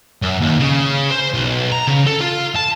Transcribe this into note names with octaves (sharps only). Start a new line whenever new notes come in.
F#2
D#2
C#3
C5
B1
A#5
C#3
A4
F4
A5